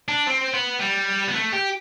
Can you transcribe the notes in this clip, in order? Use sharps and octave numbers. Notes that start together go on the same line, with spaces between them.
D4
C4
B3
G3
B3
A3
G4